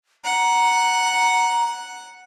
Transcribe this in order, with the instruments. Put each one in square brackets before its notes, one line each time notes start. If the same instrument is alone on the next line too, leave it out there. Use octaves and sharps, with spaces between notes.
[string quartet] F#5 [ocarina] A#5